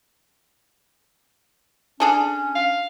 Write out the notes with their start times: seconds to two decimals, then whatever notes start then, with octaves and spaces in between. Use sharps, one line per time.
2.00 C#4 D4 G#4 A4
2.55 F5